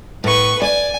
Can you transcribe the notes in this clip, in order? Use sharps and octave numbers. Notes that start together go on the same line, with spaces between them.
A2 B4 C#6
D5 G#5